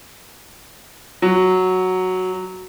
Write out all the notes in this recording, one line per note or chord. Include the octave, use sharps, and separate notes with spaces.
F#3